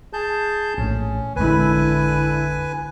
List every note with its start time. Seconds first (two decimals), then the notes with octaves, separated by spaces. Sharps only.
0.13 G#4 A5 G6
0.78 A#1 A2 C#4
1.36 A1 F2 D3 G#3 E4 B4 G#5